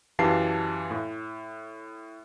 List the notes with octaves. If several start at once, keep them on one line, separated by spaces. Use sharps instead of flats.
F#2 E3 G4 F5 A5 C7
A2